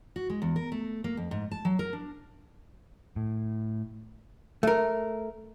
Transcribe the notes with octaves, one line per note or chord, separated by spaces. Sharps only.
F#4
G#3
E2
A#4
A3
A#3
F2
G#2
A5
F#3
A#4
D4
A2
A3 A#4